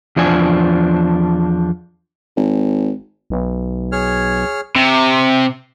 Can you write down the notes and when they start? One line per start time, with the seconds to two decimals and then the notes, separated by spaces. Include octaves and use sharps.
0.16 E2 F3 D4 G#5
2.37 G#1
3.30 B1
3.92 G#4 C#5 F6
4.76 C3